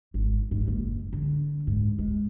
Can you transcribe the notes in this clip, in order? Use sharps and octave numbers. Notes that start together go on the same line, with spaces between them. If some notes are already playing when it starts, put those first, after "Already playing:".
G#1
G#2
F#1
D3
G#2
G#3